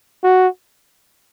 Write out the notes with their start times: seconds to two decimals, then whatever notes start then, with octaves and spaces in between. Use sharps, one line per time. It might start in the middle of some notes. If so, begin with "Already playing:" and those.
0.24 F#4